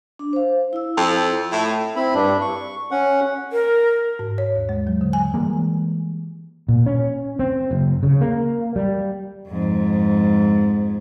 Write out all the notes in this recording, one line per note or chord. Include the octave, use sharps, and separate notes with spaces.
D4
C5 F5
E4 E6
F2
A2 E5
C4 E4 B5
G2 D4
C#6
C#4 F#5
A#4
G#2
C#5
D#2
G#3
F#3
D3
G#5
E3 G3 G#3 A#3
A#2
C#4
C4
F#1
C#3
A#3
G3
F2 G#2